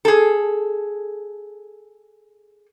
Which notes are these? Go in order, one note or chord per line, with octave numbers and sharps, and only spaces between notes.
G#4 A4